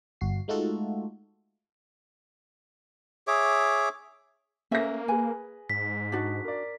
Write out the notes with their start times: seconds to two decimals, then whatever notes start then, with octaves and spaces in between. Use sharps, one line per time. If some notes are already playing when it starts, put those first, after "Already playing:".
0.21 G1 F#4 C7
0.48 G#3 A3 D#4 F4 F#4 A4
3.27 G#4 C#5 E5 D6
4.71 A3 A#3 C#4 B4 E5 A#6
5.08 G#4 B4 G#5
5.70 G#2 B6
6.12 D4 D#4 F#4 A6
6.44 A#4 D5